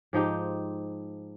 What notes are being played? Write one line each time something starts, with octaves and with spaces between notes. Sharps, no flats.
G#2 F3 D#4 G4